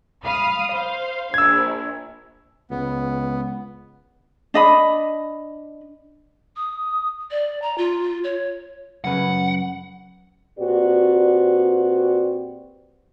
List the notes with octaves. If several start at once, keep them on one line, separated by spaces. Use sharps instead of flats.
F5 B5 D#6
C5 F5
A#1 E6 G#6
C#2 B3
D4 D#5 B5
D#6
D5
A#5
F4
C#5
F#2 C#3 B4 F#5
A#2 C4 F#4 G4 B4 D5